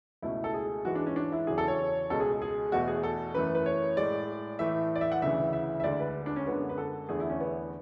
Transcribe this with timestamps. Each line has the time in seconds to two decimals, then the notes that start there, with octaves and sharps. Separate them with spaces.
0.22 C#2 B2 A3 E4
0.44 A4
0.54 G#4
0.85 G#2 E3 G#3 F#4
0.95 D4
1.06 C#4
1.16 D4
1.32 E4
1.47 E2 C#3 F#3 G#4
1.58 A4
1.68 C#5
2.10 C#2 B2 G#3 A4
2.20 G#4
2.42 G#4
2.72 E2 B2 A3 F#4
2.88 G#4
3.03 A4
3.34 F#2 E3 A3 B4
3.55 B4
3.66 C#5
3.97 A2 G#3 D5
4.59 A2 E3 A3 E5
4.96 D5
5.01 E5
5.12 F#5
5.22 D2 C#3 E3 E5
5.53 E5
5.80 E5
5.84 D2 D3 G#3 D5
6.00 B4
6.26 D4
6.36 C#4
6.46 F#2 D3 G#3 B3
6.69 B4
6.78 A4
7.09 E2 D3 A3 G#4
7.20 E4
7.30 C#4
7.40 B3